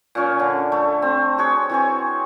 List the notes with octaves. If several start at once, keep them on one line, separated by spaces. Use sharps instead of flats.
A#2 C#4 C#5
D3
A3
C4
F#4 G#4 C#5
E3 C4 C#5